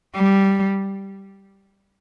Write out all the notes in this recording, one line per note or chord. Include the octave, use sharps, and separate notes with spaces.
G3